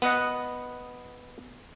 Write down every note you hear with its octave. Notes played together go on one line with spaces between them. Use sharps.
B3 B4 D#5 F#5